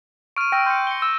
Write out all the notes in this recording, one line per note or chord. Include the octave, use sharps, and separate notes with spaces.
C#6 F6 D7 D#7
G5 E6 A#6 D7
C6 G6 C#7
C#7 G7
E6